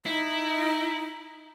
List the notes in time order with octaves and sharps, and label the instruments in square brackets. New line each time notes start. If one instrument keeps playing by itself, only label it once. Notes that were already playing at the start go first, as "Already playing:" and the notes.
[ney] D#4 [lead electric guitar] E4